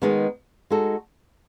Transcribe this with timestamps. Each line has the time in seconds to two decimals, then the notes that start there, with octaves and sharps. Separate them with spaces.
0.02 D#3 G#3 B3 D#4
0.70 G#3 D#4 F#4 A4